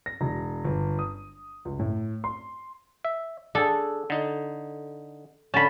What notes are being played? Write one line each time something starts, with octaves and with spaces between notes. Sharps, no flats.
A#6
E1
G1
D#6
C#2
A2
C6
E5
D4 G#4 A4
D3 D#4
D3 C#4 A5 B5